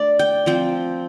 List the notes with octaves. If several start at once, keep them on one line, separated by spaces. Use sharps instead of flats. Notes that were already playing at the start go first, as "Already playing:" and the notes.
Already playing: A3 D4 D5
G5
F3 C4 G5